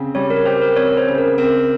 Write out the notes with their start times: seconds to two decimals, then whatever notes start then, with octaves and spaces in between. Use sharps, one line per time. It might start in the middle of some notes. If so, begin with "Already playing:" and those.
Already playing: C#3 C4
0.15 G3 C#5
0.30 A#4
0.46 G4 C5
0.62 A#4
0.76 C4 C#5
0.97 C5
1.08 C#3
1.18 A#4
1.38 C4 A#4